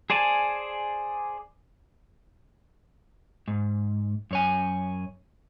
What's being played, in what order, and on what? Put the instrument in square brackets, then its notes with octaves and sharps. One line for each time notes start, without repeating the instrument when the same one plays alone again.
[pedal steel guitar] G#4 C5 D5 G#5 A5
[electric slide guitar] G#2
F#2 C#5 G#5